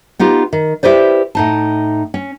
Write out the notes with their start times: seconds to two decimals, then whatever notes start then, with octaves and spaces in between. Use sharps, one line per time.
0.19 B3 D#4 F4 G4
0.53 D#3
0.83 E4 G4 B4 C5 D5
1.35 A2 D#4 A5
2.14 C#4